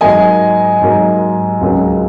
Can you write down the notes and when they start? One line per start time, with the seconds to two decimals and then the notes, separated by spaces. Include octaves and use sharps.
0.01 G#2 F#3 A#3 D#5 G#5
0.81 G#2 F#3 A#3
1.61 C#2 C#3 F#3 A#3